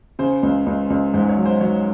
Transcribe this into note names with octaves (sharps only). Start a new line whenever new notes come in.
C#3 C5
C#2
C#2
C#2
G#2 C5
C#5
F#3
C5
F#3 C#5